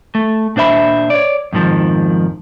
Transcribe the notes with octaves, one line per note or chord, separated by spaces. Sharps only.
A3
A#2 D4 C5 E5 B5
C#5 D5
F2 G#2 D#3 F3